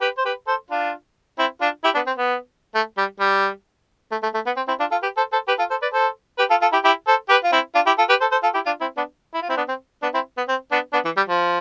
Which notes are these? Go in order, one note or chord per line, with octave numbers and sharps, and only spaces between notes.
G4 B4
C5
G4 B4
A4 C5
D4 F4
C4 E4
D4 F4
E4 G4
B3 D4
C4
B3
A3
G3
G3
A3
A3
A3
B3
C4
C4 E4
D4 F4
F4 A4
G4 B4
A4 C5
A4 C5
G4 B4
F4 A4
A4 C5
B4 D5
A4 C5
G4 B4
F4 A4
F4 A4
E4 G4
E4 G4
A4 C5
G4 B4
F4
C4 E4
D4 F4
E4 G4
F4 A4
G4 B4
A4 C5
A4 C5
F4 A4
E4 G4
D4 F4
C4 E4
B3 D4
E4
F4
C4 E4
B3 D4
C4
B3 D4
C4 E4
B3
C4
B3 D4
B3 D4
E3
G3
F3